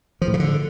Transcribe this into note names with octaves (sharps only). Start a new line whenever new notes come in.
F3
A2
C#3
D3